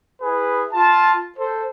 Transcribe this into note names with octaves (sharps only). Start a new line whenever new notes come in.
E4 G#4 B4
F4 A5
A4 C5